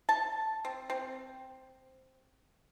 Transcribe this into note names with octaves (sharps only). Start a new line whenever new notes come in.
A5
C4
C4